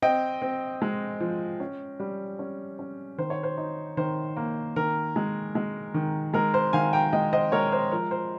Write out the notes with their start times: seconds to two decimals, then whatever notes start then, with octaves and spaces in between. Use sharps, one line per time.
0.02 C4 D#5 G5
0.42 C4
0.82 G#3
1.20 F3
1.60 C#4
2.00 G3
2.39 C#4
2.79 C#4
3.18 D#3 C5
3.30 C#5
3.43 C5
3.57 D#4
3.97 D#3 C5
4.37 A#3
4.76 D#3 A#4
5.16 G#3
5.55 G#3
5.94 D#3
6.34 G#3 A#4
6.54 C5
6.73 D#3 F5 G#5
6.93 G5 A#5
7.13 G#3 D#5 G5
7.33 C5 D#5
7.52 G#3 A#4 C#5
7.72 C5
7.92 F3 A#4
8.11 C5